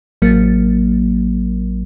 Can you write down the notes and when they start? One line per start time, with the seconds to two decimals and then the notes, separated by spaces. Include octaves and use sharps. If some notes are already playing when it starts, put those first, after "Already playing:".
0.22 A1 F#3 A#3